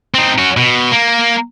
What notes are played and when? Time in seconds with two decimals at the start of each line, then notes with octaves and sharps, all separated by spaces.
0.14 C4 D#4
0.38 C#4 F#4
0.57 B2
0.91 A#3